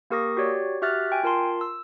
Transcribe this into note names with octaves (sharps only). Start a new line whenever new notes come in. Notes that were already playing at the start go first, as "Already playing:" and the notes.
A#3 G4 A#4 C#6 D#6 A#6
F#4 G4 C#5 D5
F#4 G4 E5 F6 F#6 A6
G5 G#5
F4 A#4 A5 C6
E6